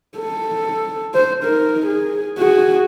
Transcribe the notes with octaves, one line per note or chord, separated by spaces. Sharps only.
A4
C5
D#4 A#4
G#4
F#4 G#4